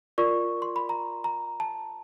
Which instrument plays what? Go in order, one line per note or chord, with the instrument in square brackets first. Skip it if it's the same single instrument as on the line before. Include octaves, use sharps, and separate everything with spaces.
[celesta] F4 A#4 D5 C#6
C6
B5
A#5
A#5
A5